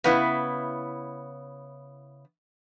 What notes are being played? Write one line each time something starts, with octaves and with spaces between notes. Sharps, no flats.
C#3 B3 E4